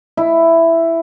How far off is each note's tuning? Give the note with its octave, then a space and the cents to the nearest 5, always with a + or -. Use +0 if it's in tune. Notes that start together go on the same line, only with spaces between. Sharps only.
E4 +5